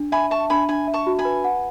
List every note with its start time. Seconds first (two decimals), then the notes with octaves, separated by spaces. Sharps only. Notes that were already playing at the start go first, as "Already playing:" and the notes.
Already playing: D4
0.12 E5 G#5 B5
0.31 E5 A5 C#6
0.50 D4 G#5 B5
0.69 D4 G#5 B5
0.87 E5
0.93 A5 C#6
1.07 F#4
1.19 G#5 B5
1.25 B4
1.44 F#5